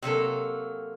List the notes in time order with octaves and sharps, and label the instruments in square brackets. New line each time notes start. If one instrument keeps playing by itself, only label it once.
[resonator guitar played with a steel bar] C3 F#3 A#3 A4